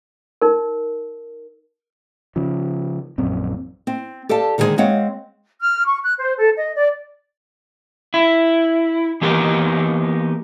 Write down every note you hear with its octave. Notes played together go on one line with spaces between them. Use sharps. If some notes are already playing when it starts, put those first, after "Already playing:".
D#4 A#4
C#3 F3
A#1 F#2 C4
C4
G4 A4 D5 F5 A5
D3 D#3 G#3 C4 G#4 C5
G#3 C4 C#5 F5 F#5
F6
C#6
F#6
C5
A4
D#5
D5
E4
E3 A#3 B3 D#4 G4 A#4